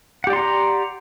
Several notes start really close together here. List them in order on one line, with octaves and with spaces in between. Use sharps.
F#5 G4 D5 C6 A#5